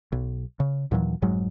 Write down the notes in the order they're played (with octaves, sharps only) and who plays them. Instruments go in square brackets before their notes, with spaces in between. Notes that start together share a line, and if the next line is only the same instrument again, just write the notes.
[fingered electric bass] B1
C#3
D#2 A#2 E3 F#3
F1 G#2 F#3 G#3